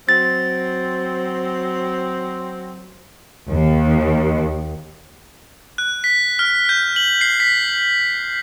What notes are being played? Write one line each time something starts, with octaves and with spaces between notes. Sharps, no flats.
F#3 C4 A6
D#2
F#6
B6
F6
G6
F#7
C7
B6